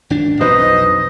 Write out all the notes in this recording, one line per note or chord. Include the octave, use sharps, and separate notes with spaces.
G#1 D4
B1 F2 B2 D#4 B4 C5 D#5